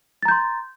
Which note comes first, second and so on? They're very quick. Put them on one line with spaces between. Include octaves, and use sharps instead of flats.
A6 A#5 G6 C6